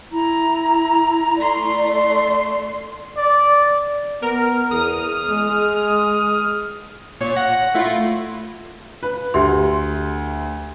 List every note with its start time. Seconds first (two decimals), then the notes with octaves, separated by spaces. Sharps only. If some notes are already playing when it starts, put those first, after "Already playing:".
0.12 E4 A#5
1.37 A3 D5 C6
3.18 D5
4.22 B3 A#4 A#5
4.71 E2 G#4 D#6 F6
5.30 G#3
7.21 A#2 C#5
7.36 F#5 A#6
7.75 A3 E4 F4
9.03 B4
9.34 D2 G4 E5 C6